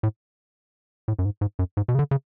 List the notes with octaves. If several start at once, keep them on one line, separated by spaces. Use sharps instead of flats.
A2
A2
F#2
G#2
G#2
F#2
G#2
B2
C#3
D3
C#3